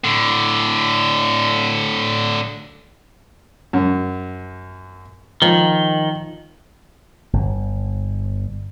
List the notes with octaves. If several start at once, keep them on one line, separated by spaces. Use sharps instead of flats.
A2 D3
F#2
D#3 F3
G1